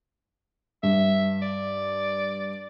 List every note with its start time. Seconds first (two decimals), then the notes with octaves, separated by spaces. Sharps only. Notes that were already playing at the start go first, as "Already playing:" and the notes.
0.83 G2 E5
1.42 D5